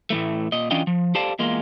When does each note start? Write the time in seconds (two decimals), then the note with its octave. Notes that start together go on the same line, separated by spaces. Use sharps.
0.10 A2 E3 A3
0.52 A#2 D#5
0.71 E3 C#4 D4 F4 D#5 G5
0.87 F3
1.15 G4 A4 C5 D5 F5 A5
1.39 E2 G#3 A#3 F4